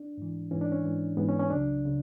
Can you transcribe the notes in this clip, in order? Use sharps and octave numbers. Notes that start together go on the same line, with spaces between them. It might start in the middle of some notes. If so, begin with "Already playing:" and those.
Already playing: D4
G#2 E3
G#2 E3 C#4
D4
C#4
G#2 E3
G#2 E3 B3
C#4
C#4
C#2 C#3 F#3 D4
C#3